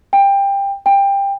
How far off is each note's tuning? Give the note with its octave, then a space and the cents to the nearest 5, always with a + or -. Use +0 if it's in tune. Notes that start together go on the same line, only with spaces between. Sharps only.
G5 +20
G5 +20